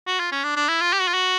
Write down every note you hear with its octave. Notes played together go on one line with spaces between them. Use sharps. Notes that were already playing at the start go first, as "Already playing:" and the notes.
F#4
F4
C#4
D4
D4
E4
F4
G4
F#4
F4
F#4